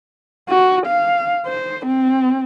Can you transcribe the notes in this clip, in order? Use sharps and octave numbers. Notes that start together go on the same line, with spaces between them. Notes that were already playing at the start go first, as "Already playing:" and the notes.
F#4
F5
C5
C4